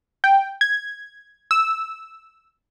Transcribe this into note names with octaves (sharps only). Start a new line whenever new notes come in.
G5
G#6
E6